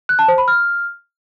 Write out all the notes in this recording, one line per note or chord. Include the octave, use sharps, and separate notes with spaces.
F#6
A5
C5
B5
F6